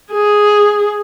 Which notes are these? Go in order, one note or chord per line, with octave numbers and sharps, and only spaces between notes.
G#4